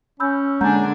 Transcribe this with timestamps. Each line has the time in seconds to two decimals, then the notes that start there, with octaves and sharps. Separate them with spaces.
0.20 C#4 B5 E6 G6
0.61 D3 G#3 A#3 D4 F#5 G#5 A#5 G6